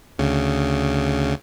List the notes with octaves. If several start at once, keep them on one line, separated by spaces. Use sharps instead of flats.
D2 C#3